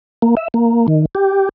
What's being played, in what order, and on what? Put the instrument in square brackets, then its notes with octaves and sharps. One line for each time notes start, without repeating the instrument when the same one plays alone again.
[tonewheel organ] A#3
E5
A#3
D#3
G4